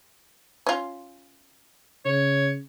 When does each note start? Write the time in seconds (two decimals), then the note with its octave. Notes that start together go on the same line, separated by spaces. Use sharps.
0.66 C#4 F4
2.05 C#3 C#5